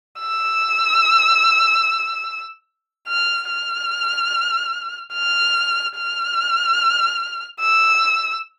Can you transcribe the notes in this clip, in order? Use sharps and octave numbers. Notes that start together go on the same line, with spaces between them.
E6
F6
F6
F6
F6
E6